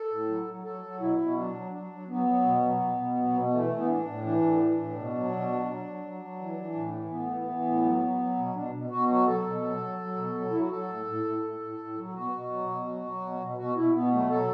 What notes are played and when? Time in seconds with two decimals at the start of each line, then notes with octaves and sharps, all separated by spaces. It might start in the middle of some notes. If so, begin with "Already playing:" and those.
Already playing: A4
0.11 A2
0.28 F#3
0.46 F#3
0.64 F#3 A4
0.82 F#3
1.00 B2 E4
1.18 B2
1.36 F#3 D4
1.54 F#3
1.72 F#3 D4
1.90 F#3
2.08 F#3 B3
2.26 F#3
2.44 B2
2.62 F#3
2.80 B2
2.98 B2
3.16 F#3
3.34 B2
3.51 E3 A3
3.70 E3
3.77 B3
3.88 A2 D4
4.06 A2
4.24 E3 D4
4.42 A2
4.60 E3
4.78 A2
4.96 B2
5.14 F#3
5.31 B2
5.49 F#3
5.67 F#3
5.85 F#3
6.03 F#3
6.21 F#3
6.39 E3
6.57 E3
6.75 A2
6.93 E3
7.11 A2 B3
7.29 E3
7.47 E3
7.65 A2
7.83 F#3
8.01 F#3
8.18 F#3
8.37 B2
8.55 B2 D4
8.72 B2
8.90 B2 F#4
9.08 F#3 F#4
9.26 F#3 A4
9.45 B2
9.62 F#3
9.80 F#3
9.99 F#3
10.16 B2
10.35 F#3
10.50 F#3 E4
10.60 F#4
10.70 F#3 A4
10.88 A2
11.06 A2
11.24 A2
11.42 A2
11.60 A2
11.78 A2
11.96 F#3
12.14 B2 F#4
12.32 B2
12.50 F#3
12.68 B2
12.86 F#3
13.04 F#3
13.22 B2
13.40 B2
13.57 B2 F#4
13.75 B2 E4
13.93 B2 B3
14.11 F#3 A3
14.30 F#3 A4